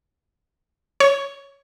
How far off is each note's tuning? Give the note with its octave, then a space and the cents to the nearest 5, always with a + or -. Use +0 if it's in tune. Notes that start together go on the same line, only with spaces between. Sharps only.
C#5 +0 C#6 +15